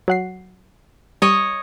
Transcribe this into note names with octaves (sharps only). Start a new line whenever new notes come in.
F#3 F#5 C7
G3 C#5 D#5